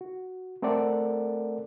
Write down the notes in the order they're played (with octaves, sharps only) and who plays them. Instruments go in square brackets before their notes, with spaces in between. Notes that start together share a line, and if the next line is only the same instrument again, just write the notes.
[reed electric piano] F#4
A3 C4 A4 A#4 D5 F#5